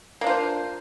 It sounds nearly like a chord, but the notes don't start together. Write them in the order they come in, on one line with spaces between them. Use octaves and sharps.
A#3 D4 F4 C5